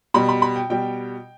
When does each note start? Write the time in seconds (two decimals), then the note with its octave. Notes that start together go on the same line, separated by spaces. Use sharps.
0.14 B2 G3 B5
0.29 B5
0.42 B5
0.56 G5
0.70 B2 G3 G5